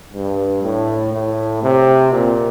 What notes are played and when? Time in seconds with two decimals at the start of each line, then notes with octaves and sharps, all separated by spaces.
0.14 G2
0.63 A2
1.13 A2
1.63 C3
2.12 A#2